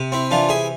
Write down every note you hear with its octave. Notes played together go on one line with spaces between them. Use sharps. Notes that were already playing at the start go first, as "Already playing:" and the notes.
Already playing: C3
C4 E4
E3 D4 F4
E4 G#4